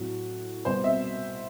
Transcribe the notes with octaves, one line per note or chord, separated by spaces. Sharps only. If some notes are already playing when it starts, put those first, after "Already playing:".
Already playing: A2 F#3 A3 F#4
C2 B2 G3 C5
E5